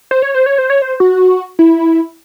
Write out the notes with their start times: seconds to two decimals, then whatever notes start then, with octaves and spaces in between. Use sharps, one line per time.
0.11 C5
0.22 C#5
0.35 C5
0.46 C#5
0.58 C5
0.70 C#5
0.82 C5
1.00 F#4
1.59 E4